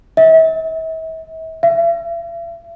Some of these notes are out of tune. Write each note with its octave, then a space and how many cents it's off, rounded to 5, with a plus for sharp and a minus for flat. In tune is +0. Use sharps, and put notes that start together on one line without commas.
E5 -40
E5 +45